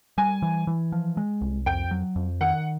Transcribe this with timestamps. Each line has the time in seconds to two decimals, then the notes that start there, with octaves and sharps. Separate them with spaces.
0.18 G3 G#5
0.42 E3
0.67 E3
0.92 F3
1.17 G#3
1.41 C2
1.66 F2 G5
1.91 F#3
2.16 F2
2.41 D#3 F#5